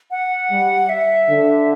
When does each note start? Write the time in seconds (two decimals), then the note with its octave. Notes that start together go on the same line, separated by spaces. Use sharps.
0.11 F#5
0.51 G3
0.89 E5
1.29 D3